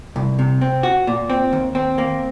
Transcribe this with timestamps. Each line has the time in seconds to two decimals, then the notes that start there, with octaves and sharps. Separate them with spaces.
0.16 C2
0.39 C3
0.61 C4
0.83 F#4
1.07 A#2
1.30 C4
1.53 D#2
1.75 C4
1.98 A#3